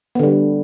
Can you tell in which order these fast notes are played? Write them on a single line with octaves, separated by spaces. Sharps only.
B3 D3 G3